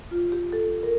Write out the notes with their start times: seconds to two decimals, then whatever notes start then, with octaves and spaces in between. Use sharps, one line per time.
0.11 F4
0.32 G4
0.52 A4
0.83 A#4